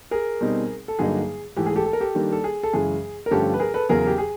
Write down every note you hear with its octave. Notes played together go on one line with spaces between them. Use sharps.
G#4 A#4
B2 G3 C4 D#4
A4
G2 D3 F#3 A#3 D#4 G#4
G#2 E3 A3 G4
G#4
G4 A4
A4
A#4
G4 A4
D#3 G3 A#3 D4
A4
G#4
A4
F#2 C#3 E3 G#3 G#4
A#4
G2 D3 F3 A3 C#4 G4 A4
B4
G#4 A#4
A4 B4
E2 C#3 F#3 G#4 A#4
G4
G#4